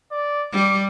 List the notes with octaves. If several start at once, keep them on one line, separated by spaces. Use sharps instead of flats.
D5
G3 D6